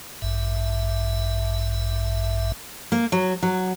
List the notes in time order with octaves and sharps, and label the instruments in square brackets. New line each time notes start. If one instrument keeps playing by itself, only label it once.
[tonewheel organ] A1 G2 E5
[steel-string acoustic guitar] A#3
F#3
F#3